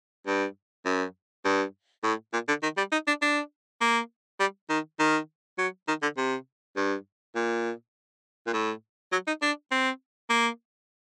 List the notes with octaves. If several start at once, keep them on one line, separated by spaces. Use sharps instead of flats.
G2
F#2
G2
A2
A#2
D3
D#3
G3
D#4
D4
D4
A#3
G3
D#3
D#3
F#3
D#3
D3
C3
G2
A#2
A#2
A2
F#3
D#4
D4
C4
A#3